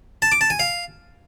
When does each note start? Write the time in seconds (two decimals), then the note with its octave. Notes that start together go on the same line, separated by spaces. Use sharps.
0.22 A5
0.32 D6
0.41 A5
0.50 G#5
0.60 F5